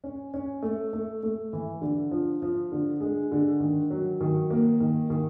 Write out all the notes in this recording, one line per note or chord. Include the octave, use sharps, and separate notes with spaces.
C#4
C#4
A3
A3
A3
E3
D3
F3
F3
D3
G#3
D3
D#3
F#3
D#3
A#3
D#3
D#3